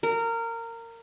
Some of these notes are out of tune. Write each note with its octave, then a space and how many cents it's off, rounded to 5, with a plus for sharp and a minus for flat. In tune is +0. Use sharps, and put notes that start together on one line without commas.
A#4 -20